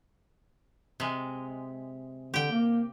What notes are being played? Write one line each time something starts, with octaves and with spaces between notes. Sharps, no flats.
C3 G#3
D3 G4 G5
A#3